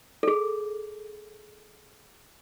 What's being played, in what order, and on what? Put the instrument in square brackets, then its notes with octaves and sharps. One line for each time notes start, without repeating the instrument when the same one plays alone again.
[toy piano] G#4 A4